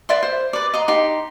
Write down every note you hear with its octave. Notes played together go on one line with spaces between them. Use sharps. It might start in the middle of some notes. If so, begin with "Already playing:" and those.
B4 D5 E5 C6
C5
B4 D5
D#5 A#5 C6
D#4 G4 C6